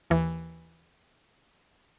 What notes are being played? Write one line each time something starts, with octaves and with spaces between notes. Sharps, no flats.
D#2 E3